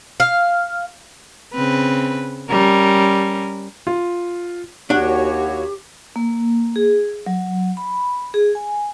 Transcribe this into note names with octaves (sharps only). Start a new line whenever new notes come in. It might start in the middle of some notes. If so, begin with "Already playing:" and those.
F5
C#3 C4 B4
G3 C#4 A#4
F4
D#2 D4 F#4 G4 C#5 F#5
A#3
G#4
F#3
B5
G#4
G#5